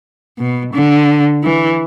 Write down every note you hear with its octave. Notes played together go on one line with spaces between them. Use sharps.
B2
D3
E3